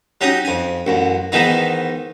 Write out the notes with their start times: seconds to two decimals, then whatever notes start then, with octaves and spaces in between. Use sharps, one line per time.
0.21 F#3 C#4 D#4 G4 D#6
0.45 F2 G#5
0.87 A1 F#2
1.32 G#2 D#3 E3 B3 D#4